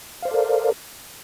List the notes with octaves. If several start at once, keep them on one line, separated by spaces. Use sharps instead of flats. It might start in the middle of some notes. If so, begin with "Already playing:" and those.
A4 A#4 C5 D5 F5